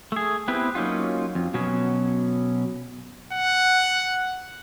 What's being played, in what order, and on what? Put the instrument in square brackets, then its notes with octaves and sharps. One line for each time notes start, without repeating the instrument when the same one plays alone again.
[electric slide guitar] A3 G#4
B3 C4 E4 G4 B4
F#3 A#3 C#4 D#4 F4
F2
B2 F#3 B3 C#4
[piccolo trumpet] F#5